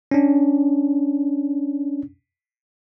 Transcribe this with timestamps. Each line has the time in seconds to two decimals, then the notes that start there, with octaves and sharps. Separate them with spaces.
0.11 C#4 D4